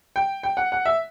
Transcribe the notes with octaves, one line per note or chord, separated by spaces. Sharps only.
G5
G5
F#5
F#5
E5